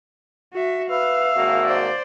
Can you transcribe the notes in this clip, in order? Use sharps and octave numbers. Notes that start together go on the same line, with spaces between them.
F#4 E5
B4 E5 F5
G#1 A#3 F#4
C5 D5